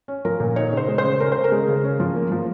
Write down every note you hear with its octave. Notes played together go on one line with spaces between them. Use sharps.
C#4
F3 A#4
A#2
D#4 C#5
C#3 C5
G#3
C5
C#3
C#4 A#4
C#3 C5
A#4
G#3
C#3
C#4
F3
A#3
F3